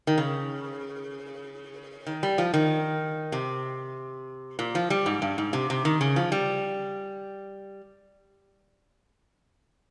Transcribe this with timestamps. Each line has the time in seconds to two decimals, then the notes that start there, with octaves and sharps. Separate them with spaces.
0.07 D#3
0.18 C#3
2.07 D#3
2.23 G3
2.38 F3
2.54 D#3
3.32 C3
4.59 A#2
4.75 F3
4.90 G3
5.06 G#2
5.22 G2
5.38 G#2
5.53 C3
5.70 C3
5.85 D#3
6.01 C#3
6.16 F3
6.32 G3